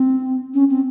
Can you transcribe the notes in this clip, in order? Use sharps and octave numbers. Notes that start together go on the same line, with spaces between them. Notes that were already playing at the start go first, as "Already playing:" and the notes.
Already playing: C4
C#4
C4